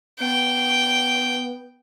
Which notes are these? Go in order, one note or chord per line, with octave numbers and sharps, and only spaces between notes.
B3 G5